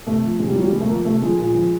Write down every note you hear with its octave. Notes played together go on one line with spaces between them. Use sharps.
C3 A3
F3
C3 G#3
G3
F3 F#3
G3
C3 G#3
A3
F3 A#3
C3 A3
F3 G#3
A#2
F3